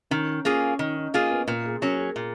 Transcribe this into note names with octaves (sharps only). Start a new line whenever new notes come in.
D#3 C#4
A#3 C#4 F4 G#4
D#3 D#4
D#4
A#3 F4 G#4
B3
A#2 A#3
G#4
F#3 C#4 A#4
A#4
G#4
A#2